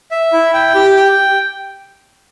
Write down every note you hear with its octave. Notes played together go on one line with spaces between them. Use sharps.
E5
E4
G5
G4
G5